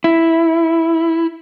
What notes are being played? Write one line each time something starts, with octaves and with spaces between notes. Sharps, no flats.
E4